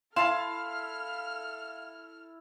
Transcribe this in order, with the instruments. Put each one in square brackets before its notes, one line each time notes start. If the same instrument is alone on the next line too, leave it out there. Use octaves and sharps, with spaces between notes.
[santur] E4 [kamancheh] A4 F6 [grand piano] F5 E7 [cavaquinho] A5 C6